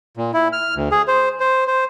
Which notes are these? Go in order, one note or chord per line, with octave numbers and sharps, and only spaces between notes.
A#2
E4
F6
D2
G#4
C5
C5
C5